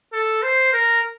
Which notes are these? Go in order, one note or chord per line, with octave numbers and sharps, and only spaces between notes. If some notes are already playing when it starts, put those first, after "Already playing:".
A4
C5
A#4